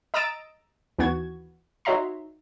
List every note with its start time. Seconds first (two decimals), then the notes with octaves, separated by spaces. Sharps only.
0.14 D#5 A#5 D#6 E6 A6 D7
0.99 D#2 E3 B3 F#4 G#6
1.85 D#4 F#4 C#5 E5 A#5 C6